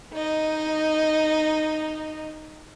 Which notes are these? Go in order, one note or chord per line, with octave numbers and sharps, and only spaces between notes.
D#4 D#5